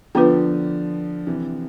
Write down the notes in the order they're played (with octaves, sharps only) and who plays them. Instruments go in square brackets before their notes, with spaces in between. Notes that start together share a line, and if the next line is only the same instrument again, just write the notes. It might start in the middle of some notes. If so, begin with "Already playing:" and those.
[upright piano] D3 F3 [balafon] B3 D4 F4 B4
[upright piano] C3 E3